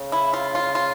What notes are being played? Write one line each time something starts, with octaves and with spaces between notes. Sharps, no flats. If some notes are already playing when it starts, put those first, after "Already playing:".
Already playing: C#3
E4
F4
F4
F4